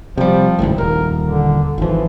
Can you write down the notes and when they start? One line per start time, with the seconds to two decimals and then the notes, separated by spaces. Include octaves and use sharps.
0.18 C3 F3 G3
0.59 G#1 C#2 A2
0.78 D#1 A#4
1.23 D3
1.78 G#1 E3 F3